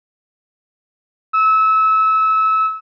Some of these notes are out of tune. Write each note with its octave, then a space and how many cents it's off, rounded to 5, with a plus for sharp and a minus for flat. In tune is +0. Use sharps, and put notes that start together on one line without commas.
E6 -25